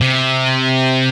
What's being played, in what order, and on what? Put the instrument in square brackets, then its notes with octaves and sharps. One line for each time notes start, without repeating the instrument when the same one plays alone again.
[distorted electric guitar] C3